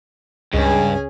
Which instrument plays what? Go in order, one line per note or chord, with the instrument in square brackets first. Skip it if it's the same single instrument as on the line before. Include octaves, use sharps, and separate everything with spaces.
[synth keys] C#2 [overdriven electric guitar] G2 [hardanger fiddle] C#4 G#4